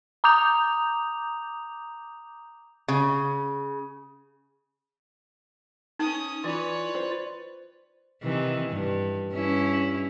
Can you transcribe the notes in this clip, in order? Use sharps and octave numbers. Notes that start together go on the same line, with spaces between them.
A#5 D6 D#6 G6 F7
C#3
C#4 D#4 D#6
E3 F4 B4 C#5 D5
C5
C3 D#3 E3
G2
G2 C#4 E4